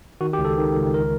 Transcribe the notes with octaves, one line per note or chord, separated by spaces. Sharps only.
D#3 F#4
G4
C#2
A4
D#3
C#2
A#4